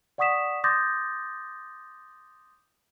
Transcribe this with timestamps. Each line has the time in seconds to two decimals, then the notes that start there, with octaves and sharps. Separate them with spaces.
0.18 D5 F#5 C#6 D#6 B6 E7
0.64 C6 D6 D#6 G6 A6 A#6